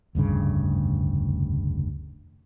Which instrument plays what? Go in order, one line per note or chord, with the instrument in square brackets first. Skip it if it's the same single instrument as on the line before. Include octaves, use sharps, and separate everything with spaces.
[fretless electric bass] F1 D2 G2 C#3